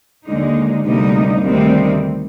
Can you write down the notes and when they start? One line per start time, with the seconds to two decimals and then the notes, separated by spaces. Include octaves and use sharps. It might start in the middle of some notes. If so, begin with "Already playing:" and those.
0.27 D#2 D3 G#3 D#4
0.84 D2 C3 G3 A#3 D#4
1.42 D2 C3 D#3 G3 C4